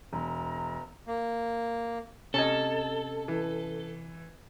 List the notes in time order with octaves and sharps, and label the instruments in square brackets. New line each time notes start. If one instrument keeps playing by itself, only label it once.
[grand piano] E1 [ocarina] A#5
[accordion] A#3
[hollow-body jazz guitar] C3 D#5 [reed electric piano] C#4 A5 G#6 [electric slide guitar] A4
[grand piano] E3